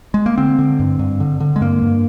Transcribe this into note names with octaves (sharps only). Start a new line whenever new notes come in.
G#3
A#3
D3 C4
D3
G2
G2
D3
D3
G#3
G2 A#3
G2